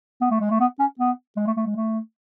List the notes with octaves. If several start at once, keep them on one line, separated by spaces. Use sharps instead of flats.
B3
A3
G#3
A3
B3
C#4
B3
G#3
A3
A3
G#3
A3